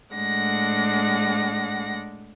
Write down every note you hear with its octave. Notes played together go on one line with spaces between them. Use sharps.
A2 G#3 D4 F#5 A#6